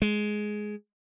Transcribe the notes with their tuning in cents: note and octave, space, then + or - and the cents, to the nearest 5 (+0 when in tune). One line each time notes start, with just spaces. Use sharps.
G#3 +10